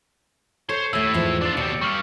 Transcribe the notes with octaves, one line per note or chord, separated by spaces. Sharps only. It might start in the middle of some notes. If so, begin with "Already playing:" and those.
A4 C5 C#5 C6 C7
D#2 A2 A3 E4 E6
E2 G#2 F3
D4 F4 D5
D#2 B2 C4 C#7
G2 G3 C#6 F6